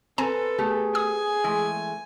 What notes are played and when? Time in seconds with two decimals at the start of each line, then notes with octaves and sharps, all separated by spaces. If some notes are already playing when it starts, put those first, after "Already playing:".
0.18 C4 A4 B4 C5 G#5 A#5
0.58 A3 B3 G4 G#4
0.95 G#5 D#6
1.44 E3 G#3 A3